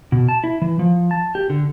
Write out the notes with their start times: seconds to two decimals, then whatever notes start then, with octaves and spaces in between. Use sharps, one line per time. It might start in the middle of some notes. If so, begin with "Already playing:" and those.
0.12 B2
0.29 A5
0.44 E4
0.62 E3
0.79 F3
1.11 A5
1.35 G4
1.50 D3